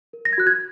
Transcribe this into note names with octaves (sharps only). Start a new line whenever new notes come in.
A#4
A#6
G#6
F#4 F#6
G#6